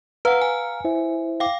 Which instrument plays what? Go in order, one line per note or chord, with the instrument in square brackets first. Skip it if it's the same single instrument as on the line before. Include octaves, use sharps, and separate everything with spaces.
[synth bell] B4 F#5 [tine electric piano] F5 A#5 F6
[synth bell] G#5
[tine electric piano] E4 C5 E5
[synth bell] F5 G5 D6